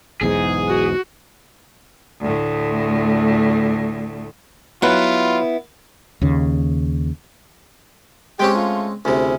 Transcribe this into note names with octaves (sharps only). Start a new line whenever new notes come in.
B1 E2 G#2 G#4
F#4
D2 A2
F#3 B3 E4 F4 B4 F#5
D#2 C#3
G#3 C4 C#4 G4
A3 F4
D2 C3 C#4 E4 G#4